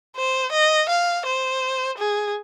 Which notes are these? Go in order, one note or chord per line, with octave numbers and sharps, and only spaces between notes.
C5
D#5
F5
C5
G#4